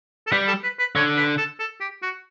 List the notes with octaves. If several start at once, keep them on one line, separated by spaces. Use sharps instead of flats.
A4
G3 B4
A4
B4
B4
D3 C#5
B4
A4
A4
G4
F#4